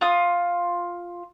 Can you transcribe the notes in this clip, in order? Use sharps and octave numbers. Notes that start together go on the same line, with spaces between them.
F4 D#6